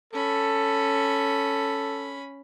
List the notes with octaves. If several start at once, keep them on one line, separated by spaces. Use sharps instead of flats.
C#4 A4 B5